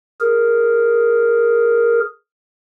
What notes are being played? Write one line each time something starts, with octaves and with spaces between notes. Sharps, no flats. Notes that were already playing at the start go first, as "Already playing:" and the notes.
G#4 A#4